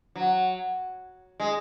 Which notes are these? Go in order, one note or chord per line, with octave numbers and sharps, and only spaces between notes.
F#3
G#3